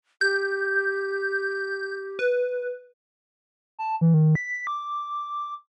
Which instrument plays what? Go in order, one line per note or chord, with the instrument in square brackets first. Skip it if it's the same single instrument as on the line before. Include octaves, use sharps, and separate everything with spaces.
[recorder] G4 [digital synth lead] G6
[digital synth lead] B4
[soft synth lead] A5
E3
D#3
B6
D6